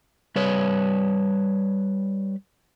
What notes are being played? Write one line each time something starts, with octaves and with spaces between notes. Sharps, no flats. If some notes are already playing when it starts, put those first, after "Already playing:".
G3 B4 C#5